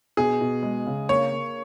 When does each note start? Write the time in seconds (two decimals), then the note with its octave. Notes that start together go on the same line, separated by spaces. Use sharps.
0.17 B2 G#4
0.41 B2
0.63 G#3
0.87 C#3
1.09 A#3 C#5
1.32 A#3